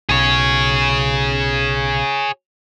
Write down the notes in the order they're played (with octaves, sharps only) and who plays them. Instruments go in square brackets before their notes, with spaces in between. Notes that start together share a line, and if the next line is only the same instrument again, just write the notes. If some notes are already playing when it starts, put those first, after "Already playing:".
[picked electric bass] B1 [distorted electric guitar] G#4 C#5